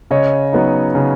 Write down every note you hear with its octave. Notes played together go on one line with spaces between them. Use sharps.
C#3 C#5 D#5
F#3 B3 D#4
C#3